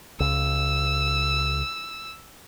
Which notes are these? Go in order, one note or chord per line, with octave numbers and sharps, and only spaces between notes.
C#2 E6